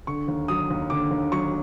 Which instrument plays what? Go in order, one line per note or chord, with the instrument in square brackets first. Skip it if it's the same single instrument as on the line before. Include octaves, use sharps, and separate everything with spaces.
[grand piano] D3 C#6
D#2
F#3 D#6
D#2
D3 D6
D#2
F#3 C#6